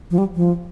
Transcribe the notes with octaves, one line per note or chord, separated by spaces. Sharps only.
F3
G3
F3